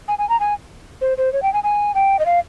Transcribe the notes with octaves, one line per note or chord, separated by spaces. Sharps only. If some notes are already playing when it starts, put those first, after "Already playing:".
G#5
G#5
A#5
G#5
C5
C5
C#5
G5
G#5
G#5
G5
D#5
F5